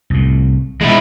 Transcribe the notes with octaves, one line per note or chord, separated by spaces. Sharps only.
C2 A2
B2 E3 G#3 E4